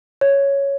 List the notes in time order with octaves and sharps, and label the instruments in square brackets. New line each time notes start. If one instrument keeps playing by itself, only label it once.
[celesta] C#5